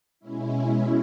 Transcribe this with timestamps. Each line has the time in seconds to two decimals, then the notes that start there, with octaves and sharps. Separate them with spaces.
0.20 B2 G#3 C#4 E4